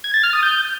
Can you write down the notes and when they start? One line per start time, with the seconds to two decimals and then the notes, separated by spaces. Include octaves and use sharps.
0.04 G#6
0.14 A6
0.23 F6
0.33 D#6
0.43 G6